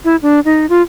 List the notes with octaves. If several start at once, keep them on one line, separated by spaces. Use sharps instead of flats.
E4
D4
D#4
F4